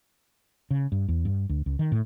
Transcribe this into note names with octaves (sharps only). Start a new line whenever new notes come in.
C#3
G2
E2
G2
D2
C#2
D#3
A2